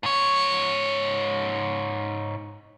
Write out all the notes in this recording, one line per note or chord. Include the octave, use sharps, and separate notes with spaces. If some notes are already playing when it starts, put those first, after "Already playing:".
G#2 C#5